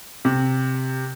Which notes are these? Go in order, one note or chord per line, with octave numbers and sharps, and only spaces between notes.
C3